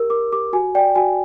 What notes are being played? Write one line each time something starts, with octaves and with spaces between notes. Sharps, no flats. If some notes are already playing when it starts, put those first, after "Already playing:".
Already playing: G4 A#4 E6
A#4 D6
G4 D6
F#4 G#5
D5 G5
F#4 G#5